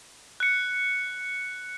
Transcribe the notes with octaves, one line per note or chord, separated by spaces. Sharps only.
F#6 C#7